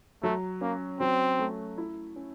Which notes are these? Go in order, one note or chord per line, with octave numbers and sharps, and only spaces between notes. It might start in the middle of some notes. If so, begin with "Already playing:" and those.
F#3 A3
A#3 C#4
F#3 C4
A3
E4
C#4